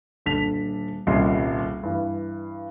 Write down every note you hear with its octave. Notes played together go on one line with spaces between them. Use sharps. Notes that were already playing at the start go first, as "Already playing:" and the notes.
D#1 D3 A5 B6 F7
D#1 C2 C#4 D#5 C6 C7
G2 E3